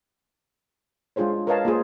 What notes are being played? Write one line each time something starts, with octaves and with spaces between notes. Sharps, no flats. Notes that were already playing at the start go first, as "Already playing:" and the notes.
G#3 D4 F4 G#4 C5 C#5
A#4 B4 C#5 D#5 F5 A5
A#3 F4 G#4 C5